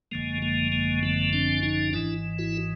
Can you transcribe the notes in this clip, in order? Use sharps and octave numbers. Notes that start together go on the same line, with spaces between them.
G#1 F#2 D3 F3 G#3 A#3
G#3 A#3
G#3 A#3
A3 B3
C4 D4
C#4 D#4
G#1 G#2 E3 D4 E4
E4 F#4